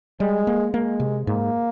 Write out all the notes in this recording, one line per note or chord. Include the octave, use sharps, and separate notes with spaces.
G3 G#3
A#3
G#3 A#3
C3
G#2 A#3